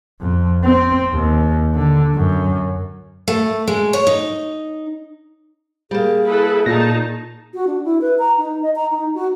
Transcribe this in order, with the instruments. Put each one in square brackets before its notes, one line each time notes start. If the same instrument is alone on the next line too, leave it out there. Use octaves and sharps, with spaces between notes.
[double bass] F2
C4
D#2
D3
F#2
[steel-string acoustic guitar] A3
G#3
C#5
D#4
[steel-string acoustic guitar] G3 A#3 [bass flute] G#4
[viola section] E4 A4 B4
[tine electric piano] A#2 A#6 [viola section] D#3 D#4 A5
[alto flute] F#4
D4
E4
B4
A#5
D#4
D#5
A#5
D#4
F#4